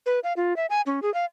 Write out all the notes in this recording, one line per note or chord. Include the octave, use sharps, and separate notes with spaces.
B4
F5
F4
E5
G#5
C#4
G#4
F5